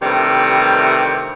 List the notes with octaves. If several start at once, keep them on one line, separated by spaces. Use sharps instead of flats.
G2 C3 D#3 E3 G3 A3